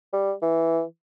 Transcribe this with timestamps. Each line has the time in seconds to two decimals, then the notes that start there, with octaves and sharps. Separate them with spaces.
0.13 G3
0.42 E3